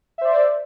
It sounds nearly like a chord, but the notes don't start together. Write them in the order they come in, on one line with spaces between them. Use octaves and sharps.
E5 C5 D5